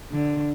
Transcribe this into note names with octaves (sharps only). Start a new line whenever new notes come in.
D3